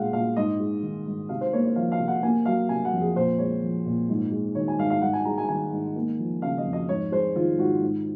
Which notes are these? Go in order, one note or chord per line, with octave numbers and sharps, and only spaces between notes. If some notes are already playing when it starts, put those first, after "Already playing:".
Already playing: A#2 G#3 F5 F#5
A#2 F5
G#2 D#5
G#3
D#3
G#2
C3 F5
C5
A#3 C#5
C#5
F3 F5
F5
C3
F#5
A#3 G#5
F#3 F5
C3 G#5
F#5
F2
G#4
A#2 C5
G#3 C#5
F3
A#2
G#2
G#3
D#3 C#5
G#5
G#2 F5
F5
G#2 F#5
G#5
G#3 A#5
G#5
D#3 G#5
G#2
A#3
F3
C#3 F5
D#5
F2
D#5
G#2 C#5
G#3 C5
D#3 F4
G#2 F#4
G#2